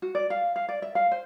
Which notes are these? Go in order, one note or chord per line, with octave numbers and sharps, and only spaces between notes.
F#4
D5
F5
F5
D5
E5
F5
C5